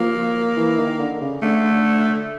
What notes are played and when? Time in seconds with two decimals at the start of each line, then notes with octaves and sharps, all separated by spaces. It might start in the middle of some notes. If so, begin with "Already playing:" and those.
Already playing: F3 A#3
0.57 E3
0.78 D#3
0.99 D3
1.21 C#3
1.42 D3 A3